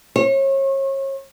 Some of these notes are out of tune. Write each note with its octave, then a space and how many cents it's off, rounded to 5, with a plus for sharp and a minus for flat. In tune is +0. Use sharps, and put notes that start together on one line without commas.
C#5 -35